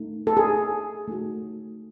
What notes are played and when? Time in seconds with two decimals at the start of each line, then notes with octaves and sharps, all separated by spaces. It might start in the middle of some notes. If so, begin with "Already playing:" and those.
Already playing: A3 D#4
0.27 A4
0.37 G#4
1.08 A3 D#4 F#4